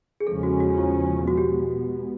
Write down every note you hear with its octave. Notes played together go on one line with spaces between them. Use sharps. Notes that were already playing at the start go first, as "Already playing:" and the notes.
G#4
E2 C#3 F3 G#3 C#4 A4
F#4
F#4
F4
B2 G#3 B3 F#4
G4